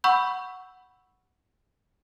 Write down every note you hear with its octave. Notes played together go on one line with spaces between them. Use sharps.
F#5 B5 C#6 E6 G6